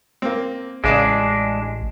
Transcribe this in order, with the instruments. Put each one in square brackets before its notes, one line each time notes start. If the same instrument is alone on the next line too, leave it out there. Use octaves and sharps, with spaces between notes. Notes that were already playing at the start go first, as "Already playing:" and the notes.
[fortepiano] A#3 C4
[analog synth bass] A1 [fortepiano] C#3 D5 D#5 [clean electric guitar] G#3 D4